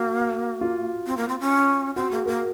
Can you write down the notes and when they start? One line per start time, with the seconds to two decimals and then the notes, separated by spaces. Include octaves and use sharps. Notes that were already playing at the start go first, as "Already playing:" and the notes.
Already playing: A#3 F#4
0.61 F4
1.06 C4
1.17 A#3
1.28 C4
1.40 C#4
1.96 C4 F#4
2.11 A#3 G#4
2.26 A#3 A#4